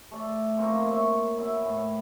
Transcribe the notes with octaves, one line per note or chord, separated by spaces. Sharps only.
A3 D5
F3 A#3 C4 C#6
C#5 E5
B2 E4
A2